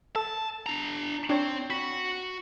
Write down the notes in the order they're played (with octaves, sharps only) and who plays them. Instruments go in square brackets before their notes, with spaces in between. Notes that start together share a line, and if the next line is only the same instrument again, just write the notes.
[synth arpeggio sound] A4 [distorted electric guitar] A5
[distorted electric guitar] D4 A#5
[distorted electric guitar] C4 [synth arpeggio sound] D4 C#5
[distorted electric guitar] F#4 [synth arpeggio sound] B5